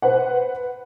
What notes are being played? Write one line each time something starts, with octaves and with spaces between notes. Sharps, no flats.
B4 C5 F#5